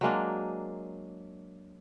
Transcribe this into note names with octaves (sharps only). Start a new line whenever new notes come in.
F#3 G#3 A#3 D4